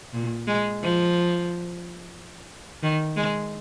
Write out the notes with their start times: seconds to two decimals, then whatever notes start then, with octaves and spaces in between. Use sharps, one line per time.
0.14 A#2
0.47 G#3
0.82 F3
2.83 D#3
3.16 G#3